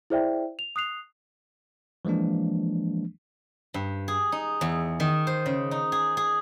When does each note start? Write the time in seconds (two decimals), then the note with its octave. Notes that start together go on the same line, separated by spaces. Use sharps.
0.10 E4 G#4 C5 D5 E5 G5
0.59 F7
0.76 D#6 F#6 C7 F7
2.05 E3 F3 G#3 A#3 D4
3.74 G2
4.08 G#4
4.32 D#4
4.61 E2
5.00 D#3
5.27 C5
5.46 C#3
5.71 D#4
5.92 G#4
6.17 G#4